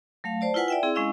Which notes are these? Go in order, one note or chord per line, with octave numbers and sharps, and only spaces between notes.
F#3 A3 F5
C5 D5 A5
E4 F4 B4 F#5 G#5
D5 E5 G5
C4 E4 G#4
G#3 C#4 E4 D#5 F5